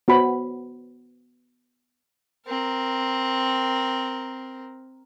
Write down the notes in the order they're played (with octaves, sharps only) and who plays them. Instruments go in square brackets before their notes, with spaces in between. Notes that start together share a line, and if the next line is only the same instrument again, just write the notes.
[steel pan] B3 F#4 C5 B5
[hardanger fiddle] C4 A#4